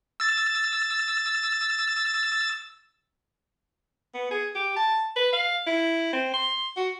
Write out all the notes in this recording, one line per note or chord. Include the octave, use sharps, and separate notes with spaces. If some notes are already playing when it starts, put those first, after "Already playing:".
E6 A6
B3
G#4
G4
A5
B4
F5
E4
C4
C6
F#4